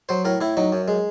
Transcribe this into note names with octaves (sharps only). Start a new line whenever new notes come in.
F#3 C5
A2 A#4
A2 E4
F#3 D#4
F#2
G#3